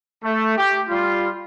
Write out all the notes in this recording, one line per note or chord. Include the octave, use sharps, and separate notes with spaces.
A3
G4
G3 F4